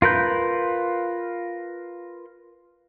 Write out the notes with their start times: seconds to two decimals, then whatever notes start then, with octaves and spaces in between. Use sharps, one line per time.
0.02 F4 A#4 B4 G6